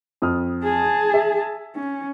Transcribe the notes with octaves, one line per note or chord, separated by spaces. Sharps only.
F2 D#6 F6
G#4 A5
E5
C#4